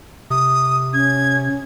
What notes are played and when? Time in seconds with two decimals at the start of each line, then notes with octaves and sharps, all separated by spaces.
0.30 C3 D#6
0.93 C#4 G#6